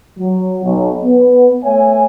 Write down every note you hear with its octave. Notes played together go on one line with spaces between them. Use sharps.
F#3
B1
B3
A3 C#5 E5 G#5